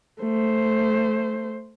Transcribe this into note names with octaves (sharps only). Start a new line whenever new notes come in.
A3 C5